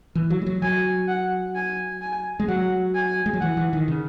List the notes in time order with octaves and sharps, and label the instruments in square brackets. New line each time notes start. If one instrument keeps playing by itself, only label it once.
[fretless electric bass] E3
F#3
G#3
F#3
[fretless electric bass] F#3 [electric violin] G#5
[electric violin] F#5
G#5
G#5
[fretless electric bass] G#3
[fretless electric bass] F#3 [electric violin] F#5
[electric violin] G#5
[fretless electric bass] G#3
F#3
[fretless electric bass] E3 [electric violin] F#5
[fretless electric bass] E3
D#3
C#3